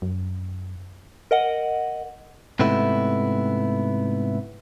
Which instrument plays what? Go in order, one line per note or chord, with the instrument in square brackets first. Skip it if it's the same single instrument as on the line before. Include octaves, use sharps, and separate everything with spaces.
[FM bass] F#2
[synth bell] A#4 D#5 F#5
[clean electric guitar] G#2 C3 A3 B3 E4